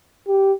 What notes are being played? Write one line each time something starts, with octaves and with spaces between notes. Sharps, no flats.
G4